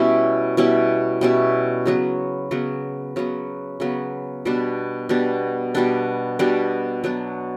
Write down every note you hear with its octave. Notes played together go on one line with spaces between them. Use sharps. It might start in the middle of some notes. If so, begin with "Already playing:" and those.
Already playing: B2 G3 C#4 E4
B2 G3 C#4 E4
B2 G3 C#4 E4
C#3 F#3 B3
C#3 F#3 B3
C#3 F#3 B3
C#3 F#3 B3
B2 G3 B3 D4
B2 G3 B3 D4
B2 G3 B3 D4
B2 G3 B3 D4
F#3 B3 D4